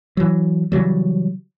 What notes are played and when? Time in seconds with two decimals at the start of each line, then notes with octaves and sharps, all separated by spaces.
0.17 E3 F#3
0.72 C#3 E3 F#3 G3